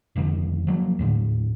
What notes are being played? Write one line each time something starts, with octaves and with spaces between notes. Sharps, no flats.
F1 F2 D3 D#3
F3 F#3 A#3
D#2 A2 D3